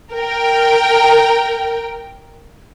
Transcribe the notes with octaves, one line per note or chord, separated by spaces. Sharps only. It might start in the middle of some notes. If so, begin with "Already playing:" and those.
A#4 G5